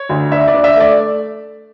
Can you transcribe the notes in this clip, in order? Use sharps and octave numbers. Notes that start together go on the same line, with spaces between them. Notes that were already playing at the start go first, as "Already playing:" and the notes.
Already playing: C#5
D2
D4 E5
D5
D4
E5
A3 D5